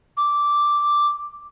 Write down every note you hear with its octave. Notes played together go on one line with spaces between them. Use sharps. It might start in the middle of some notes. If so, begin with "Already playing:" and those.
D6